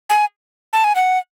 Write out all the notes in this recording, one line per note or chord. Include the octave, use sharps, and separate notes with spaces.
G#5
A5
G#5
F#5